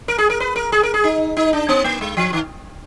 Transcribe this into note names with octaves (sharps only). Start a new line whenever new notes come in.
A#4
G#4
A#4
B4
A#4
G#4
A#4
G#4
D#4
D#4
D4
B3
A#3
G#3
F3
D#3